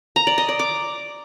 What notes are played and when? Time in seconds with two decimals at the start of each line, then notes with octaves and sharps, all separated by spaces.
0.16 A#5
0.27 D5
0.38 D#5
0.49 D5
0.59 D6